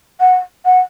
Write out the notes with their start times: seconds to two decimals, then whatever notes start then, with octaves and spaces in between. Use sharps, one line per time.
0.20 F#5
0.65 F#5